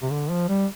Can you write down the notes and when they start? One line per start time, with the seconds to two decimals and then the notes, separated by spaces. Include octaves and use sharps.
0.02 C3
0.11 D3
0.30 F3
0.49 G3